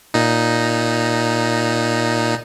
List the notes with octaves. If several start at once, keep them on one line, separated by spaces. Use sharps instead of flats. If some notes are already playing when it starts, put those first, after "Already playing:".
A#2 D#4